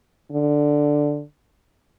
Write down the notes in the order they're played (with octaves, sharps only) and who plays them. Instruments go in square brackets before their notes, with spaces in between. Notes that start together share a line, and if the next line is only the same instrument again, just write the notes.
[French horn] D3